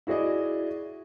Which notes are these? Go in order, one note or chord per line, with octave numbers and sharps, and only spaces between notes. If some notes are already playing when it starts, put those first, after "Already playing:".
E4 F#4 G#4 D5 D#5